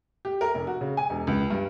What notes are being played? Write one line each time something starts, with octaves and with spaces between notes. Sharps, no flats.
G4
A#4
F1
F#4
C#3
G#5
E1
C#2
G2